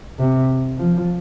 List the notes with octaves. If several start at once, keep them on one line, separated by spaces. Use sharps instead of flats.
C3
F3